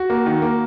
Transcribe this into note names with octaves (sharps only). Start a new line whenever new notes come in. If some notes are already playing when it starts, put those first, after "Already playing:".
Already playing: F#4
A#3
D#3
A#3